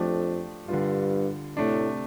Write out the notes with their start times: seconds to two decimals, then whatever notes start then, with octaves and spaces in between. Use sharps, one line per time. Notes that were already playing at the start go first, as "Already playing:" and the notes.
Already playing: F2 F3 A3 D4 G4
0.68 G2 D3 G3 F4
1.57 A2 C3 A3 D4